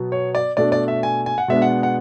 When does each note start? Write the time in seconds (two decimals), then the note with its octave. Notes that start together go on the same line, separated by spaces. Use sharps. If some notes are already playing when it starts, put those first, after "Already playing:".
Already playing: B2 F#3 B3
0.12 C#5
0.35 D5
0.57 B2 A3 D4 D5
0.72 D5
0.88 E5
1.03 G#5
1.26 G#5
1.38 F#5
1.48 B2 G#3 B3 D4 E5
1.62 F#5
1.83 F#5